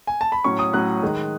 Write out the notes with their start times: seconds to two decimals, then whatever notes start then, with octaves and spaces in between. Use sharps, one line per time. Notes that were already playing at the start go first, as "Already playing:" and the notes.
0.07 G#5
0.21 A5
0.32 B5
0.44 A2 F#3 C#4 C#6
0.59 D#6
0.73 A2 F#3 C#4 F#6
1.03 D#3 G#3 D#4